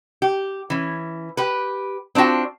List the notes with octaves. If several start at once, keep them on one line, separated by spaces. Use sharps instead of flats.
G4
E3 C#4
G4 B4
C4 D4 F4 F#4 G5